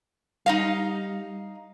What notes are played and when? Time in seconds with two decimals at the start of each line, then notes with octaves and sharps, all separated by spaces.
0.46 G3 D#4 D#5 F5